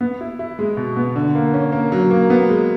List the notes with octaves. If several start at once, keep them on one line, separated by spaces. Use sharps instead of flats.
B3
E4
E4
G#3
B2
B3
D3
A#3
C#4
A#3
F#3
A#3
B3
G#3